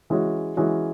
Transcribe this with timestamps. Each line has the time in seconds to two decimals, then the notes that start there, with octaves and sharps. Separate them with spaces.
0.10 E3 G#3 C#4 F#4
0.57 E3 G#3 C#4 F#4